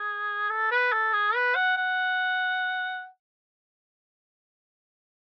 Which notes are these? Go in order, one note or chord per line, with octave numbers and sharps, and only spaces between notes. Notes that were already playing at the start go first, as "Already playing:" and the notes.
Already playing: G#4
A4
B4
A4
G#4
B4
F#5
F#5